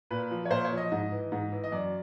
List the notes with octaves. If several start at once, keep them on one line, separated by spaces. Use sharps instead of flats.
A#2 B4
F3
C#5
A#2 C5
C#5
F3
D#5
G#2 D#5
E3
G#2
E3
D#5
F#2 D5